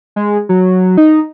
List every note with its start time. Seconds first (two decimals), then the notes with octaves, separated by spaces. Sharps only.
0.16 G#3
0.49 F#3
0.97 D#4